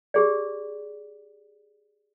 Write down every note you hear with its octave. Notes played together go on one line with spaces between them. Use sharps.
G4 G#4 D5